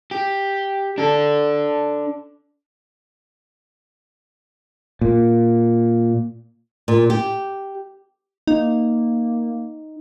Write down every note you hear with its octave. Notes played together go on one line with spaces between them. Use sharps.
G4
D4 A4
A#2
A#2
G4
A#3 D#4